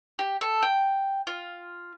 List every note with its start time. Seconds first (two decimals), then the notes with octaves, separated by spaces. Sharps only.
0.19 G4
0.41 A4
0.62 G5
1.27 F4